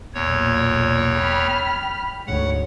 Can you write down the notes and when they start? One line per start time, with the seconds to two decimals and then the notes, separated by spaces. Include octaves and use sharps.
0.14 B1 E2 A#2 C#5
1.17 G5 B5 F6
2.27 D2 G#2 C#5 F#5